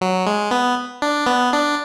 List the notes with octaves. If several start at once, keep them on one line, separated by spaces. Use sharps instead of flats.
F#3
G#3
B3
D4
B3
D4